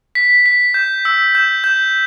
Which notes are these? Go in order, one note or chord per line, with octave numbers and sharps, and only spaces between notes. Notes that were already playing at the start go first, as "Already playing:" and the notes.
B6
B6
G6
E6
G6
G6